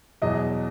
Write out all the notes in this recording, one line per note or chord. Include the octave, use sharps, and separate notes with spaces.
E2 B2 F#3 D#5